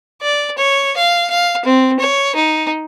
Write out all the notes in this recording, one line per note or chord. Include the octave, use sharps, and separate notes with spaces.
D5
C#5
F5
F5
C4
C#5
D#4